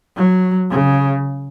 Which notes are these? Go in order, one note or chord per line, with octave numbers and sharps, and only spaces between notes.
F#3
C#3